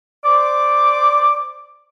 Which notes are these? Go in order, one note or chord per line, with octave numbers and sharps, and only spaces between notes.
C5 D5 D6